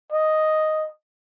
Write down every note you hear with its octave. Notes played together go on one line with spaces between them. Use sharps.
D#5